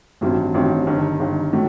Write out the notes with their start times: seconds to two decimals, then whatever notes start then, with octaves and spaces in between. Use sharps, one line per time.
0.21 A1 G2 D#3 F#3 C4
0.54 A1 G2 D#3 F#3 C4
0.87 G1 G2 D#3
1.19 G1 G2 D#3
1.53 A2 F#3 A3